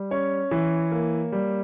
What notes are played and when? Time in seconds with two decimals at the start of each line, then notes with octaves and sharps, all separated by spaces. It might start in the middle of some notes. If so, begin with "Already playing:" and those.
Already playing: G3
0.11 C#4 C#5
0.51 E3
0.91 A#3
1.32 G3